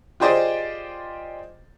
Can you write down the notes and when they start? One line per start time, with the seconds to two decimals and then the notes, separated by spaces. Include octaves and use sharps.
0.20 F4 G4 G#4 C5 D5 D#5